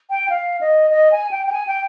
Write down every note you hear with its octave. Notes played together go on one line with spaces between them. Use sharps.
G5
F5
D#5
D#5
G#5
G5
G5
G#5
G5